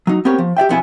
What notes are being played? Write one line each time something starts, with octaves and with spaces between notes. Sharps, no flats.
F#3 D#4
B3 C4 G4 A#4 C#5
F3
G4 D5 E5 G5
F2 B2 B3 E4 B4 G#5